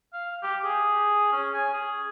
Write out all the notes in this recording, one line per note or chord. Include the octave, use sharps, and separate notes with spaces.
F5
G4
G#4
C#4
G#5
G#4